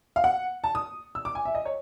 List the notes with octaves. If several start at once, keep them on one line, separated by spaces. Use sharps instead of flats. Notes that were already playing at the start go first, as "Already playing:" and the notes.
F5
F#5
A5
D#6
E6
D6
G#5
E5
D#5
C#5